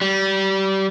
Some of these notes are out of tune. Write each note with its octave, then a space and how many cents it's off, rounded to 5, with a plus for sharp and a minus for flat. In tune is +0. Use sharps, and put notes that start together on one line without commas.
G3 -25